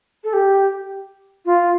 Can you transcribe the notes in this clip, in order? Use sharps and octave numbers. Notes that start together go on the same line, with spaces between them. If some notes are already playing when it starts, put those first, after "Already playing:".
A4
G4
F4